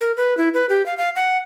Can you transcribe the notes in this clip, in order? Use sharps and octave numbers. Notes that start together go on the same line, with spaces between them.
A#4
B4
E4
B4
G4
F5
F5
F#5